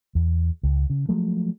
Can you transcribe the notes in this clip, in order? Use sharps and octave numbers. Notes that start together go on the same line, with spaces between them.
E2
C#2
C#3
F3 F#3 G#3 A3